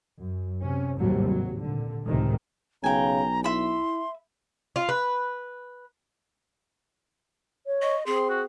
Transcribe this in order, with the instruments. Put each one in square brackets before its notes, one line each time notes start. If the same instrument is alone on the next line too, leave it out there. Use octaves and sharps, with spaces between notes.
[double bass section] F#2
C3 C#4
G#1 D#2 A2 C3 F#3 G3
F#3
A#2 D3
C#2 A2 C3 D#3 G#3
[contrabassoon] B1 [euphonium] C#3 [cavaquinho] G5 G#5 [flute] A#5
[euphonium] E4 [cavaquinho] E5 B5 [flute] C6
[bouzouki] F4
B4
[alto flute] C#5
[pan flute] D#5 [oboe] C#6
[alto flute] C4 [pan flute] G#4 [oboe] C6
[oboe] F#4